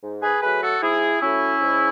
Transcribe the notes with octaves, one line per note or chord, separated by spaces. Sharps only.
G#2
G#4 B4
F#3 A3 G#4 B4
F#4 A4
G#2 E4 G#4
F#3 A3 C#4 E4
G#2